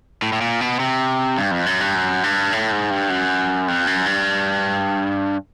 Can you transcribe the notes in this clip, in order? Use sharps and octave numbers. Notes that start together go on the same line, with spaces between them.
A2
A2
A#2
B2
C3
G2
F2
F#2
G2
F#2
G2
A2
G#2
G2
F#2
F2
F#2
G2